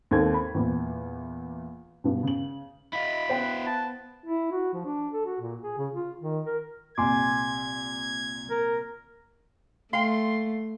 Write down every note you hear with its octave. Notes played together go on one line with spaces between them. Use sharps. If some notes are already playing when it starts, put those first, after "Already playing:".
D#2 G#2 D#3 C4 A4 G#6
B5
E2 A#2
G2 B2
C#3 F#7
E4 D#5 F5 B5
B3 C5 G5
A5
E4
F#4
F3
D4
A4
F#4
A#2
G#4
C#3
F4
D#3
A#4
C2 A#2 G#5 C6 D6 G#6
A#4
A3 F5 G5 C6